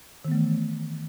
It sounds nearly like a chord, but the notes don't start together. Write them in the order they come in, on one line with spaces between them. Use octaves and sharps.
D#3 B3 A3 E3